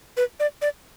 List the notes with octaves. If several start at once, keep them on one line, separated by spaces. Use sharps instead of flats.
B4
D5
D5